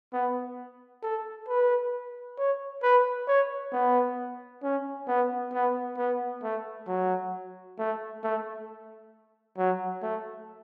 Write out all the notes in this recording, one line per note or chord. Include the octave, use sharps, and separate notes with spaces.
B3
A4
B4
C#5
B4
C#5
B3
C#4
B3
B3
B3
A3
F#3
A3
A3
F#3
A3